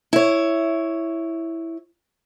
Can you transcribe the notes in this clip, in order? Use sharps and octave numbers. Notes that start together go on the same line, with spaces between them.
E4 C#5